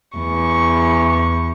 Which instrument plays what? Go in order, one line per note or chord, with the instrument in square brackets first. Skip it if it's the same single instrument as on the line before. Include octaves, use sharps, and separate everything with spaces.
[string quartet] E2 C#6